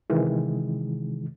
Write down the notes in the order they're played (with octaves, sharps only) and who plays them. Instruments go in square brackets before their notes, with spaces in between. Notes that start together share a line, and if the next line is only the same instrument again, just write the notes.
[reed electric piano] C3 D#3 E3 G#3